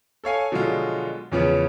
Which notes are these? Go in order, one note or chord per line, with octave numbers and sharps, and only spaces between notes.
A4 C#5 F5 G#5
B2 D3 F3 F#3 G#3 F4
E2 C#3 F3 B3 C#4